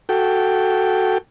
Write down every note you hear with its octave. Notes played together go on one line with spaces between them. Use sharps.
F#4 A4 G5